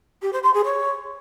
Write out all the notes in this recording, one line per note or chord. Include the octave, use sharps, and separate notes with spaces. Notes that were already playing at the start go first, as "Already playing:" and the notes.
G4
C5
C6
G#4
C#5